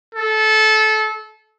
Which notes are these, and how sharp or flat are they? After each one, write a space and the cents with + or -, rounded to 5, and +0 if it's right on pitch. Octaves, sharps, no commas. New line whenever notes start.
A4 -20